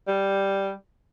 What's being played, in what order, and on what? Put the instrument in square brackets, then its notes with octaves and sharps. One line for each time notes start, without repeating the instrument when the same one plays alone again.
[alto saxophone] G3